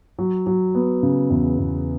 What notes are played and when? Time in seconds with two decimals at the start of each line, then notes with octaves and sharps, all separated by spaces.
0.19 F#3
0.47 F#3
0.75 B3
1.03 C#3
1.30 E2
1.58 E2